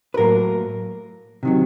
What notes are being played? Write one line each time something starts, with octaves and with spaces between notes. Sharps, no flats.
B4
A2 F#3 A#3 A#4
C3 D#3 F#3